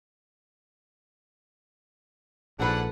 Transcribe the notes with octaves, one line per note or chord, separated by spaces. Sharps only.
A#1 G#2 D4 A4 B4 F#5